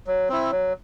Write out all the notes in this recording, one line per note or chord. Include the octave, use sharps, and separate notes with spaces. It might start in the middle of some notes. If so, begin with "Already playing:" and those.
F#3
C4 E4
F#3